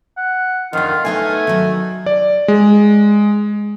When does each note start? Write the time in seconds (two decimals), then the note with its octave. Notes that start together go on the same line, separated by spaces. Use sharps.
0.17 F#5
0.73 F2 D3 D#3 F4
1.05 A3 B3 D#4 C#5 G#5
1.47 D#3 F#3
2.06 D5
2.48 G#3